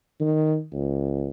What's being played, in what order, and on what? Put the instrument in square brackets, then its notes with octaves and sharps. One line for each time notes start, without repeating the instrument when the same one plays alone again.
[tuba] D#3
C#2